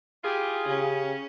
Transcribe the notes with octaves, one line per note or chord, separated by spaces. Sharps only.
E4 F4 G4 G#4
C#3 C#4 G4